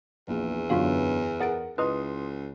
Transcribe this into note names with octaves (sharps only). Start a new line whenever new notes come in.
A#1 E2
F#2 D3 B3 F4 F#4 F5
G#4 A#4 F#5 A6 D7
C#2 E4 B4 D#5 C6 D#6